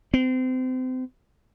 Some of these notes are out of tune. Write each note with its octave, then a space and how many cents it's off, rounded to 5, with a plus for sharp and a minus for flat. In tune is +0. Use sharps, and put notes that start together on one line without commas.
C4 -30